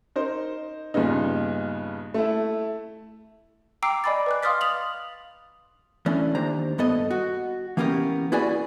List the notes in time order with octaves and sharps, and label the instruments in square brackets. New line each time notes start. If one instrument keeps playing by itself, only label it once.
[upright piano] D#4 A#4 C5
G2 A#2 C#3 B3 D#4
A3 E4
[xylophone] G5 A#5 D6 E6 C7 D7
D5 D#5 G#5 B5 D6 A6
B4 D6 F#6
F5 C6 D#6 F6 A6 B6
D#6 F7 F#7
[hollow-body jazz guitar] E3 A3 C#4 D4
D#2 D4 C5 A#5
G2 B3 A4 D#5
F#4
E3 A#3 B3 C#4 G4 A#4
E4 F#4 G#4 B4 D5 G#5